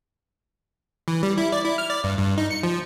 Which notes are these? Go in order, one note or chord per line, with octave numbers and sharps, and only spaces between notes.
E3
G3
E4
D5
E4
F6
D5
G2
G2
D#4
C#7
F3